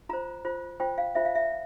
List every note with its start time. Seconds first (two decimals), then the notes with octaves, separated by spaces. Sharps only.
0.09 F4 C5 A#5
0.45 F4 C5
0.80 F4 C5 G5
0.98 F5
1.15 F4 C5 E5
1.25 F5
1.35 E5